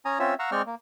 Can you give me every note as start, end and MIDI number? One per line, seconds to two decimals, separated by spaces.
0.05 0.19 61
0.05 0.19 80
0.05 0.19 82
0.05 0.19 87
0.19 0.34 60
0.19 0.34 61
0.19 0.34 65
0.19 0.34 73
0.19 0.34 76
0.19 0.34 88
0.39 0.50 77
0.39 0.50 78
0.39 0.50 82
0.39 0.50 85
0.39 0.50 88
0.52 0.62 56
0.52 0.62 60
0.52 0.62 74
0.52 0.62 79
0.52 0.62 85
0.52 0.62 89
0.66 0.75 58